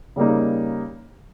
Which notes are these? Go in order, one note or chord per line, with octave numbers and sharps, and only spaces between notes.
C#3 G3 A#3 D#4